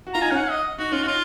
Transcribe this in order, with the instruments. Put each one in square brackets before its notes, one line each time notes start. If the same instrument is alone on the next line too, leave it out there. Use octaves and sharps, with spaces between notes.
[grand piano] F#4
[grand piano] F4 [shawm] A#5
[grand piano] D#4 [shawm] G#5
[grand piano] C#4 [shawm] F5
[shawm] F#5
D#5
[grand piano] D#4 [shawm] F#4
[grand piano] C#4 [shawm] F4
[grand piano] D#4 [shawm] F4 F#4